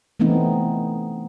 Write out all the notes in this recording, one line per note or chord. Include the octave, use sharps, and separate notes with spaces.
E3 A3 B3 C4 D#4